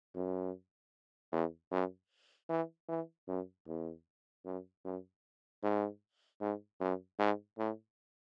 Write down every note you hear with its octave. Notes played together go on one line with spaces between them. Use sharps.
F#2
E2
F#2
E3
E3
F#2
E2
F#2
F#2
G#2
G#2
F#2
G#2
A2